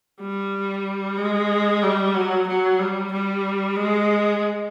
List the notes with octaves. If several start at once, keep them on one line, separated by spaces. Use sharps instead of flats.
G3
G#3
G3
F#3
F#3
G3
G3
G#3